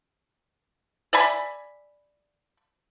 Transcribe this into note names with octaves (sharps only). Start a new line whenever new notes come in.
D5 E5 G#5 B5